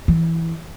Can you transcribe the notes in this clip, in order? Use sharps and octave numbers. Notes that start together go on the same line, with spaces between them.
E3